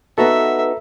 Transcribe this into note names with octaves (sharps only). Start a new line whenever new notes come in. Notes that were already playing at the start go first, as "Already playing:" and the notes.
B3 D#4 F#4 A4 B4 E5 A#5